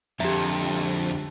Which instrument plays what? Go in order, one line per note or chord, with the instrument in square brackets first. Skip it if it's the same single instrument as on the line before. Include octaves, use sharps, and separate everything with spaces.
[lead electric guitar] F2 [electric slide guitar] D3 G#3 A#5 [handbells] G4 E5